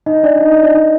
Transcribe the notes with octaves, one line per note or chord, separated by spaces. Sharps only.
D#4 D#5
D4 D5
D#4 D#5
D#4 D#5
D4 D5
D#4 D#5